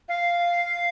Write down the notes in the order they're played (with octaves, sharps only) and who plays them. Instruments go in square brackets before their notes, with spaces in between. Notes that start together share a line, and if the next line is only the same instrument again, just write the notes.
[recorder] F5